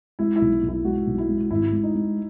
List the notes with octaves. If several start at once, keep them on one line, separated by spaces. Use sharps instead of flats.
G#3 E4
E4
B1
B1
E4
G#3 F#4
B1
E4
G#3
G#1 E4
G#3
D#4
G#3